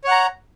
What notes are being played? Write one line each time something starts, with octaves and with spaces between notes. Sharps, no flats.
C#5 F#5 A#5